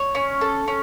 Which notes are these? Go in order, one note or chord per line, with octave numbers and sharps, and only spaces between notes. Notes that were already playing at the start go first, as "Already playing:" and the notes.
Already playing: C#5
C#4
A4
C#4